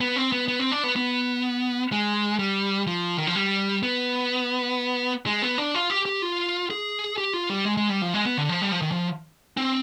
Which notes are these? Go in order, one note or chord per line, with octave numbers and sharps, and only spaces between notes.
B3
C4
B3
B3
C4
D4
B3
B3
G#3
G3
F3
D#3
F3
G3
B3
G#3
B3
D4
F4
G4
G4
F4
G#4
G4
F4
G3
G#3
G#3
G3
F3
G#3
B3
D3
F3
G3
F3
D#3
F3
C4